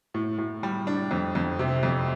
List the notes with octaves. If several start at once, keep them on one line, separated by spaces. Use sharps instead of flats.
A2
A2
G3
D4
F2
F2
C3
F2